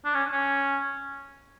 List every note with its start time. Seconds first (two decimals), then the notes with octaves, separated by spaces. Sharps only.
0.05 D4
0.14 C#4
0.32 C#4